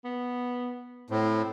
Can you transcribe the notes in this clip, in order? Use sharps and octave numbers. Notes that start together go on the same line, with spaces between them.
B3
A2 C4